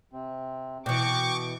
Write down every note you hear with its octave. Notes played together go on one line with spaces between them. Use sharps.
C3 C4
B2 E3 G5 C#6 D6